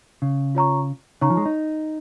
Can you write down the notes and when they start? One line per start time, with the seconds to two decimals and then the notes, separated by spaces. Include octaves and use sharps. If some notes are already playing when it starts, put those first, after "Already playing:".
0.22 C#3
0.55 F4 C#5 A#5 C#6
1.21 C#3 D#4 C#5 A#5 C#6
1.30 F3
1.37 G#3
1.45 D#4